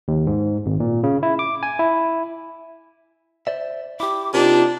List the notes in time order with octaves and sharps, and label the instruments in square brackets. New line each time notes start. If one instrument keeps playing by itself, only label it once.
[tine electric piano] D#2
G#2
G#1
A#2
C#3
E4
D6
G#5
E4
[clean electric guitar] C5 D5 E5
[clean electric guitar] E4 G4 [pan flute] D6
[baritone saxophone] C3 [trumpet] D4 [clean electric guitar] D#4 A#4 [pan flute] F4